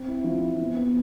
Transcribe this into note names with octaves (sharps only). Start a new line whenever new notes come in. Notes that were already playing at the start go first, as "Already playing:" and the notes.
Already playing: C4
E4
F3
E4
B3
B3